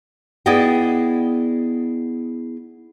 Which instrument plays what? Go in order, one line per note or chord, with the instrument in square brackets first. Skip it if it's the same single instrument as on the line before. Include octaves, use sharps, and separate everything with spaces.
[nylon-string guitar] B3 E4 G#4 D5 D#5 G5